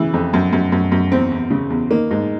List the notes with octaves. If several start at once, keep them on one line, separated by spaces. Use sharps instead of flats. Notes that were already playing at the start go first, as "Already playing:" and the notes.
Already playing: C#3 E3
F2
F#2
F#2
F#2
F#2
E2 C4
E2
C#3
E2
D#3 A#3
G#2